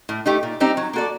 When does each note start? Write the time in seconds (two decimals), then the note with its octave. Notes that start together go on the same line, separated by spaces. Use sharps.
0.09 A2
0.26 A3 D#4 G4
0.43 A#2
0.60 G3 C4 D#4 G4
0.77 F#3
0.93 A#3 F#4 A4 D5